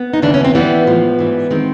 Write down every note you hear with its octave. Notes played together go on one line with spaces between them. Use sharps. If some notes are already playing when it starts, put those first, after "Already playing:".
Already playing: B3
D#4
D#2 C#3 E3 D4
C#4
C4
A2 E3 G3 B3
A2 F3 G#3
G#2 E3 G3
D#3 G#3 C4